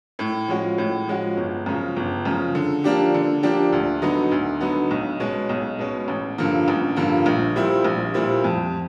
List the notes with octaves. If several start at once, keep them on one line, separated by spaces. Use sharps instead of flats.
A2
F3 G#3 C#4 F#4
A2
F3 G#3 C#4 F#4
G1
F#2 C#3 F3
G1
F#2 C#3 F3
D3
F3 A#3 D4 G4
D3
F3 A#3 D4 G4
D2
D3 F#3 B3 D#4
D2
D3 F#3 B3 D#4
B1
B2 G#3 C#4
B1
B2 G#3 C#4
A1
G2 D3 F3 A#3
A1
G2 D3 F3 A#3
A#1
A#2 G3 C4 E4
A#1
A#2 G3 C4 E4
F2